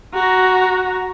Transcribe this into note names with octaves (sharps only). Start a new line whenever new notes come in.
F#4 A#5